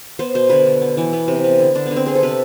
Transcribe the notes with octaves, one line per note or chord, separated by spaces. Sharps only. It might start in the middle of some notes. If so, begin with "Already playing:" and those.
B3 C5
B2 C5
D3 B4
D3
B3
E3
B3
C3
B3
D3
D3 D4
B3
D3
C4
B3 G#4
A4
C3 B4